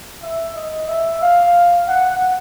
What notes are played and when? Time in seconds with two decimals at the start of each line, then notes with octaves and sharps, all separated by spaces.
0.23 E5
0.56 D#5
0.88 E5
1.21 F5
1.88 F#5